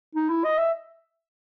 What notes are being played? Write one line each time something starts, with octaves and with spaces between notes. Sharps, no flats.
D#4
E4
D#5
E5